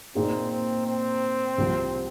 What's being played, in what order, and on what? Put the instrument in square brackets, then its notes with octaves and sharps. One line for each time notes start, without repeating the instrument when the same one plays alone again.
[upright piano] A#2 A#3 D#4 G#4 [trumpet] C4
[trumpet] C4
C4
[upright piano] C2 C3 F3